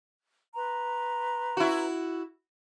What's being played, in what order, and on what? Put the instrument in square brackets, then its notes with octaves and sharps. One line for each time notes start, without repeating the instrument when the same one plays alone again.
[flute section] B4 A#5 C6
[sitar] E4 F#4